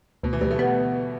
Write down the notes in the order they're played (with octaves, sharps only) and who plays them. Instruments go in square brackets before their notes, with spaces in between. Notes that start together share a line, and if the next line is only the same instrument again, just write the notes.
[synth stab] D2 [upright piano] B2
[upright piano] E3
[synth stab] D2 [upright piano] G3
[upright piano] A3
[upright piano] G3 [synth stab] B3